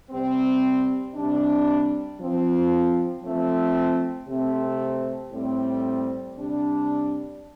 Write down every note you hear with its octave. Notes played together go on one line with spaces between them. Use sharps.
C3 G3 C4
C3 G3 D4
F3 C4
F3 A3 C4
C3 A3 C4
A2 G3 C4
C3 G3 D4